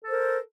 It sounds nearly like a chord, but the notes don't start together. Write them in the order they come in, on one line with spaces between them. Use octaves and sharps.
A4 C5 A#4